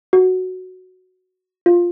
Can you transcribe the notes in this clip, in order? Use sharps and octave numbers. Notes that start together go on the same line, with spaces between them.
F#4
F4